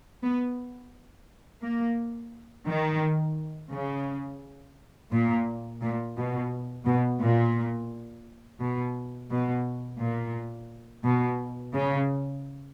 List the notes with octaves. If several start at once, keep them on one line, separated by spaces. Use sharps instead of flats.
B3
A#3
D#3
C#3
A#2
A#2
B2
B2
A#2
B2
B2
A#2
B2
C#3